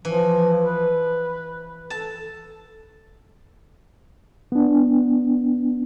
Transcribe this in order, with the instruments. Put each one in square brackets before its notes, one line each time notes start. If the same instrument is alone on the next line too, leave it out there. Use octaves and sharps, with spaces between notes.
[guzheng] E3 [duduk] F3
[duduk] B4
[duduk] A4 [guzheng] A5
[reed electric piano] B3 D4